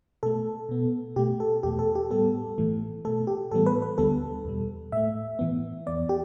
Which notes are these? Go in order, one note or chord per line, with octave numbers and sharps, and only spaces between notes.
B2 A3 A4
B2 B3
B2 A3 G4
A4
E2 B2 A3 G4
A4
G4
A2 G3 B3 A4
A2 E3 A3
B2 A3 A4
G4
A2 E3 G3 B3 A4
B4
B4
D2 D3 G3 B3 A4
E2 B2 G3
A2 A3 E5
A2 E3 B3
E2 E3 B3 D5
G4